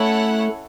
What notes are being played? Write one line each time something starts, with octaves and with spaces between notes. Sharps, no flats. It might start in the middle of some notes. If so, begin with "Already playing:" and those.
Already playing: A3 C#4 E4 A4 C#5 F#5